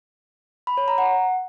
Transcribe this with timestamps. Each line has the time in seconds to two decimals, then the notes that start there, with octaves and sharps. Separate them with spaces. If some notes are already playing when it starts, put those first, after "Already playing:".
0.67 B5
0.77 C#5
0.88 A#5
0.98 F#5